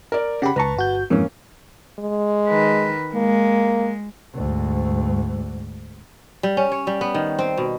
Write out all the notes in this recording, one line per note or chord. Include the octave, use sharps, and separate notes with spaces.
A#4 D5
C#3 G4 F#5 B5
C#2 B4 A5 A#5 C#6
G1 F#4 G6
F2 G#2 E3 A#3 C#4
G#3
D#3 B4
G#3 A#3
D2 G#2
G3
C#4
C#5
G3
B3
D#3
C4
B2